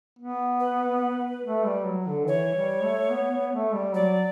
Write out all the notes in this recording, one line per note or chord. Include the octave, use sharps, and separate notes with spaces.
B3
B4
A3
G3
F#3
D3
E3 C#5
G3
A3
B3
B3
A3
G3
F#3 D5